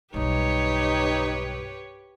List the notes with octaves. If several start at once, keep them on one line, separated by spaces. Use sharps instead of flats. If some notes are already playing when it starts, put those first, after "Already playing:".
B1 G2 D#4 G4 B4 C#5